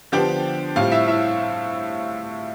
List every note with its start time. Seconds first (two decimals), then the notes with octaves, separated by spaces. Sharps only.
0.12 D3 F3 B3 D4 G4 G5
0.76 A2 G3 C4 F4 F5
0.92 E4 E5
1.08 E4 E5